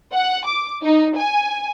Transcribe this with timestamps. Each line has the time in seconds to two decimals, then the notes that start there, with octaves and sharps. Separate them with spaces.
0.14 F#5
0.46 D6
0.83 D#4
1.17 G#5